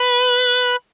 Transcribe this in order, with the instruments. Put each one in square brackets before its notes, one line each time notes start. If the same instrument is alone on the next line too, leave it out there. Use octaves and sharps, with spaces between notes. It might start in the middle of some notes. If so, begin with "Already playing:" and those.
Already playing: [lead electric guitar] B4